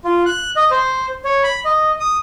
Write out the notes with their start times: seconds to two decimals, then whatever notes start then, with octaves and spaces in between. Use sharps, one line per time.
0.04 F4
0.26 F#6
0.56 D#5
0.71 C5
1.25 C#5
1.43 B5
1.65 D#5
2.00 D#6